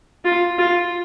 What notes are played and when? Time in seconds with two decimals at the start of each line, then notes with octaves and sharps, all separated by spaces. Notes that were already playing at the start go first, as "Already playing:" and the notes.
0.25 F4
0.58 F4